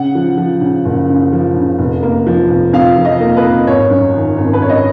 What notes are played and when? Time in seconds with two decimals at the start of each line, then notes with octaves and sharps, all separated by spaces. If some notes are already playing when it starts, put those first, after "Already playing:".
Already playing: C#3 F#5
0.15 F3
0.38 F3
0.61 C#3
0.85 F#1
1.09 C#3
1.33 F3
1.56 C#3
1.79 F1
2.03 A#3
2.27 F3
2.50 F1
2.73 F2 F5
2.97 F3
3.05 D#5
3.20 A#3
3.37 B4
3.43 A#3
3.67 G#1 C#5
3.90 F#2
4.14 D#3
4.38 G#1
4.53 B4
4.62 G#1 C#5
4.69 D#5